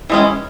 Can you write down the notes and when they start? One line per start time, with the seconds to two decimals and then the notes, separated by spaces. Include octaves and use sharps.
0.10 E3 G#3 C#4